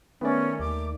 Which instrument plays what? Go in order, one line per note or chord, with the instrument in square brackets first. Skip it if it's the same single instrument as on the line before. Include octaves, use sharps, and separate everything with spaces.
[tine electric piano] D#3 A3 D5 [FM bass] B3 [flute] C#4
[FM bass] D#2 [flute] D6